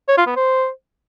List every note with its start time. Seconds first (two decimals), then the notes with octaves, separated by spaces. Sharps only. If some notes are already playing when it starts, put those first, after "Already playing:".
0.08 C#5
0.17 F4
0.27 B3
0.36 C5